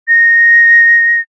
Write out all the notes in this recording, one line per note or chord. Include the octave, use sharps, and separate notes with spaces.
A#6